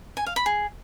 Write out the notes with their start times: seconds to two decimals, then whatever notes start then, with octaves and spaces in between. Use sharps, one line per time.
0.17 G#5
0.26 F5
0.36 B5
0.46 G#4